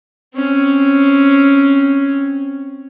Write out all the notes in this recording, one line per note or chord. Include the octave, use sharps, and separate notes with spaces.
C4 C#4